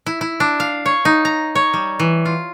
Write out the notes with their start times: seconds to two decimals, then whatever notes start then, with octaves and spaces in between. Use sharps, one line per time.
0.06 E4
0.21 E4
0.40 D4
0.60 F5
0.86 C#5
1.05 D#4
1.25 A#5
1.55 C#5
1.73 G3
1.99 E3
2.25 F4